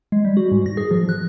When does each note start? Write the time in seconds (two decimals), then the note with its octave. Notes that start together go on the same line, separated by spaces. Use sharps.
0.12 G#3
0.25 G3
0.37 F#4
0.52 G#2
0.66 A#6
0.77 G#4
0.91 F3
1.09 F#6